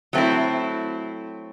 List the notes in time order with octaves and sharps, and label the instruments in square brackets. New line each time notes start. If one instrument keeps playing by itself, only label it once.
[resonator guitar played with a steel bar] F#3 A3 C4 E4